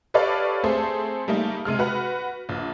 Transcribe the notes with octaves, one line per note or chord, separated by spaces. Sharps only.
G4 A4 B4 C#5 D5 F5
A3 C4 G#4 A4 C5
G3 A3 A#3 D#4
C3 G#3 F6
F#4 B4 F#5
A#1